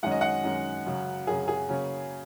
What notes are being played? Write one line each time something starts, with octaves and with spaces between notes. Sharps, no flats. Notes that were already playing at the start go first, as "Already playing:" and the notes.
F#2 D#3 G#3 C#4 F#5
D#5
F#5
F#2 D#3 G#3 C#4
F#2 C#3 F#3 C#4
F#2 C#3 F#3 C#4 G#4
G#4
C#3 F#3 A#3 C#4